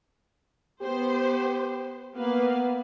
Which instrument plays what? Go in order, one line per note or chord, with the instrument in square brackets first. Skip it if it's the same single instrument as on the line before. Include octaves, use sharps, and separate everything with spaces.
[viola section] B3 C5 [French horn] G4
[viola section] A#3 B4 F5 [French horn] B3